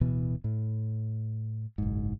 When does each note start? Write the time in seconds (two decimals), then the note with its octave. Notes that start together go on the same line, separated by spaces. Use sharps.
0.01 D1 B2 E3 B3
0.44 A2
1.78 F#1 B1 G#2